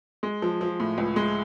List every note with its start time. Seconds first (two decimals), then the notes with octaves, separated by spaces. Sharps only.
0.23 G#3
0.42 F3
0.61 F3
0.80 A2
0.98 C#2
1.16 G#3